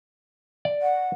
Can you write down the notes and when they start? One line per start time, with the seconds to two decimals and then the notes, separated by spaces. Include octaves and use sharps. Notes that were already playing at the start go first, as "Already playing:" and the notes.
0.65 D5
0.82 F#5